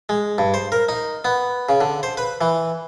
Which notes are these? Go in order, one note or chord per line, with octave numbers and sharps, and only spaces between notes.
G#3
G2
C5
A#4
D#4
B3
C#3
D3
C5
B4
E3